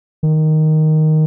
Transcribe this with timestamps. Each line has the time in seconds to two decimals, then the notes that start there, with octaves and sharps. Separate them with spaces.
0.23 D#3